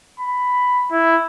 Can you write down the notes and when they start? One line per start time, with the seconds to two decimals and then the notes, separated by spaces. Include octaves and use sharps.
0.20 B5
0.91 E4